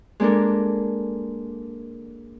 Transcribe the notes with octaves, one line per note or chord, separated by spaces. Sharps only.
G#3 A#3 D4 A4 A#4